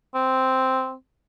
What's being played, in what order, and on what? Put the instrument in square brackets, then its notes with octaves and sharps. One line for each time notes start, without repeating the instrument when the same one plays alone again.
[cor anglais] C4